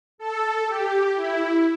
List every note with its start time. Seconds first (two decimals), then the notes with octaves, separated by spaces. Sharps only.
0.18 A4
0.66 G4
1.15 E4